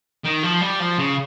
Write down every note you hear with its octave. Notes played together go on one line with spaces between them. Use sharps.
D#3
F3
G3
F3
C#3